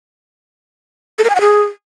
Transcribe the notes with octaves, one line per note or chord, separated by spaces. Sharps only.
A4
A#4
G#5
F#5
G#4